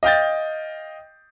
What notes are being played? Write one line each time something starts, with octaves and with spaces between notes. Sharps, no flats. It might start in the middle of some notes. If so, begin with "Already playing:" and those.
D#5 F5 G5 G6 A6